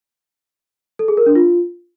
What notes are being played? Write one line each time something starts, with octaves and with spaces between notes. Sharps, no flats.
A4
G#4
A#4
D4
F4